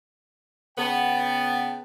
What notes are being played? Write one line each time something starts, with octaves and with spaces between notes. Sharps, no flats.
C#3 B3 G5 A5